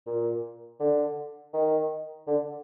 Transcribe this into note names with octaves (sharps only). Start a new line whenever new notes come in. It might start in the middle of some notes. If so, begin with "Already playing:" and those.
A#2
D3
D#3
D3